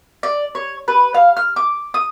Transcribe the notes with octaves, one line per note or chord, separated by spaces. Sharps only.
D5
C#5
B4
F5
F6
D6
D#6